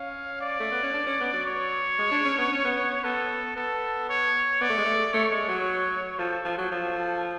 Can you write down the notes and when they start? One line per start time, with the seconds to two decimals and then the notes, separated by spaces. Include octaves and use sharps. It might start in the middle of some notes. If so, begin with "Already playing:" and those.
Already playing: C#4 F5
0.41 D5
0.60 A3
0.71 B3
0.83 C#4
0.94 D4
1.07 C#4
1.20 B3
1.33 F#3
1.46 C#5
1.99 G#3
2.11 D4
2.25 C#4
2.38 B3
2.52 C#4
2.64 B3
3.04 B3 A4
3.56 B3 A4
4.09 C#5
4.61 B3 D5
4.70 A3
4.78 G#3
4.85 A3
5.13 A3 C#5
5.31 G#3
5.48 F#3
6.19 F3 A4
6.45 F3
6.58 F#3
6.71 F3 A4